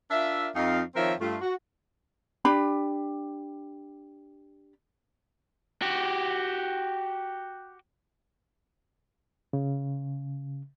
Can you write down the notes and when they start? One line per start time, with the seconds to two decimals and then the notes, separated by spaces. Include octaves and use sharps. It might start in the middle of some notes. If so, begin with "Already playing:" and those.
0.11 D4 F4 A#4 E5
0.55 F2 D#4 F5
0.95 D#3 F3 C4 A#4 C#5 E5
1.20 G2 A3 F4
1.41 F#4
2.45 D4 G4 B5
5.82 F#4 G4
9.53 C#3